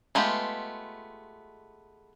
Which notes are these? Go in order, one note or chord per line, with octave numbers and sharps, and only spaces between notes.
G#3 A3 B3 F4 G4